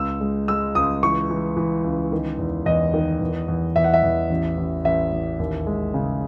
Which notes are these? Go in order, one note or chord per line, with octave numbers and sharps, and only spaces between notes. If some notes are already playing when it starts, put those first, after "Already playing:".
Already playing: C#2 E6
G#3
G#3 E6
C#2 D#6
E3 C#6
E3
E3
C#2
D#3
E2
E2 D#5
D#3
E2
E2
E2 E5
F#5
E5
E2
A1
A1
A1 E5
A1
D#2
G#3
C#3